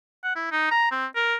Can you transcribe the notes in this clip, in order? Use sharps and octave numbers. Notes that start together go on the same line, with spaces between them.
F#5
E4
D#4
A#5
C4
A#4